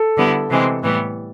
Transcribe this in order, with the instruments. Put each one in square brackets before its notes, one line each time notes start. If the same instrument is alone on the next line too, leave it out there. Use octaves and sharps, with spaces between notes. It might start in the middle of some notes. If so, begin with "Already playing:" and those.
Already playing: [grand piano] A4
[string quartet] D3 G3 B3 E4
C3 E3 G#3 C4
A2 E3 G3 B3